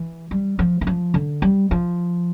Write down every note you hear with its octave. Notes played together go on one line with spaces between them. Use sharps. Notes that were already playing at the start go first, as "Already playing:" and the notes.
Already playing: E3
G3
F3
E3
F3
D3
G3
F3